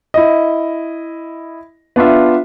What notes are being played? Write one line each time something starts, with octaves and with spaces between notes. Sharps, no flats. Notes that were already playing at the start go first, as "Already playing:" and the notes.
E4 D#5
B3 D4 F4 E5